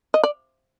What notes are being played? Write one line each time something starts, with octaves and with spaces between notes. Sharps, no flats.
D#5
D5